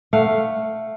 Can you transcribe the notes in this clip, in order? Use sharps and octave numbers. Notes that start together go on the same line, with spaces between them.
A3 F5 F#5